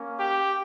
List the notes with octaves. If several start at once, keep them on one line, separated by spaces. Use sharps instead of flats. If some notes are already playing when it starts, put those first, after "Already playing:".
Already playing: A#3 C#4
G4